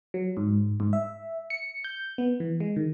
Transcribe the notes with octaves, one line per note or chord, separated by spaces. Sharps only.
F#3
G#2
G#2
E5
C#7
G6
B3
E3
G#3
D#3